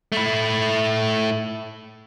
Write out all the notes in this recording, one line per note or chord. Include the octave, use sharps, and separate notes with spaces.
A3 E4